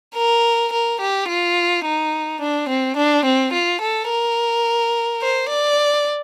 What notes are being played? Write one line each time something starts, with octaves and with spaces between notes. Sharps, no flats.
A#4
A#4
G4
F4
D#4
D4
C4
D4
C4
F4
A4
A#4
C5
D5